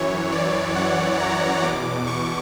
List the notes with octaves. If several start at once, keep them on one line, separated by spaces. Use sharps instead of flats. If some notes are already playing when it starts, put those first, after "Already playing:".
Already playing: F#2 E3 C#5
D5
F#5
A#5
E2 B2 D6
C#6